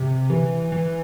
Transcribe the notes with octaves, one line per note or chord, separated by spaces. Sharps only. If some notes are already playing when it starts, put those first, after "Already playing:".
Already playing: C3
E3
E3